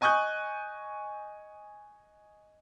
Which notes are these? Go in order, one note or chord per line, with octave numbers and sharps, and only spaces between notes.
D#5 G#5 C#6 D#6 F#6 G6